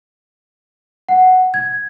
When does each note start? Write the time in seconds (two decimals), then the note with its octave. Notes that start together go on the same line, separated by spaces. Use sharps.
1.09 F#5
1.54 G#6